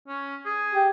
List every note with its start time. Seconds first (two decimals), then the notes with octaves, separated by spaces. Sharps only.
0.08 C#4
0.45 G#4
0.73 G4